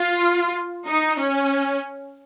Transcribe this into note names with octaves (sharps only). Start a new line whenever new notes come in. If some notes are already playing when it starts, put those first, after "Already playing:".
Already playing: F4
D#4
C#4